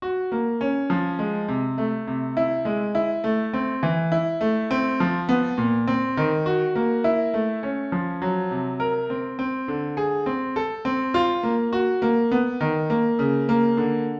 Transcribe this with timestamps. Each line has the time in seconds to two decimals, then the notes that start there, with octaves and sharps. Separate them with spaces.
0.02 F#4
0.32 A#3
0.61 C#4
0.90 F3
1.19 G#3
1.48 C3
1.78 A3
2.07 C3
2.37 E4
2.65 G#3
2.95 E4
3.24 A3
3.53 C4
3.83 E3
4.12 E4
4.41 A3
4.71 C4
5.00 F3
5.29 B3
5.58 A#2
5.87 C4
6.17 D#3
6.46 F#4
6.75 A#3
7.04 E4
7.34 A3
7.63 C#4
7.92 F3
8.22 F#3
8.51 C3
8.80 A#4
9.10 C4
9.39 C4
9.68 D3
9.97 G#4
10.26 C4
10.56 A4
10.85 C4
11.14 F4
11.43 A#3
11.73 F#4
12.02 A#3
12.31 B3
12.61 D#3
12.90 A#3
13.19 C#3
13.49 A#3
13.77 D3